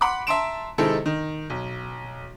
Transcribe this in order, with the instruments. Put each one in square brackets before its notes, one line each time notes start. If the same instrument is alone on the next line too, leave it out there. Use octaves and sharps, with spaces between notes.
[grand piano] F#5 B5 C6 D6
E5 A5 A#5 C6 D7 E7
C3 D#3 G#3 C4 E4 A4
D#3
B1